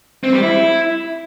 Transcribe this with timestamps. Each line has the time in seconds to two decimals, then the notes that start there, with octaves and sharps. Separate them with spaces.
0.24 C4
0.33 G3
0.42 E4